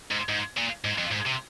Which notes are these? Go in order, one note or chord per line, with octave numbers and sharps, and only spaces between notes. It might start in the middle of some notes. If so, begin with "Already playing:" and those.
G#2
G#2
A#2
G#2
F2
G#2
C3